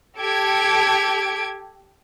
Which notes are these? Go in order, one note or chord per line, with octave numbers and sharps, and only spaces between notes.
G4 A4 G#6 D7